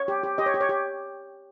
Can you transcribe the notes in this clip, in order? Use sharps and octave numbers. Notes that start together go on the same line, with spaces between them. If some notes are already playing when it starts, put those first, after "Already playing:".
Already playing: C#5
G4
G4
G4 D#5
C#5
G4
C#5
G4